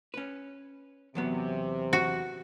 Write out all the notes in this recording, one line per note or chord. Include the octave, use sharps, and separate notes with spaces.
C#4 B4
E2 C3 F#3 B3
F#4